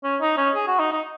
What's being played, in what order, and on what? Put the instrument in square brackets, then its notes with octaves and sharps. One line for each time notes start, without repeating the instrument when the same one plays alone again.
[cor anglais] C#4
D#4
C#4
G#4
F#4
D#4
D#4